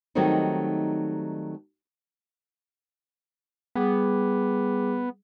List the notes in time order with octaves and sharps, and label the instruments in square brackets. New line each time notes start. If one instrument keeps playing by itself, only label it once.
[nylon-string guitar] D#3 F#3 G3 A3 C4 D#4
[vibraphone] G3 G#4 D6 [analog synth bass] B3